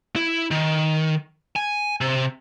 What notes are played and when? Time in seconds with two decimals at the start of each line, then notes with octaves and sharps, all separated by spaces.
0.16 E4
0.51 D#3
1.56 G#5
2.01 C3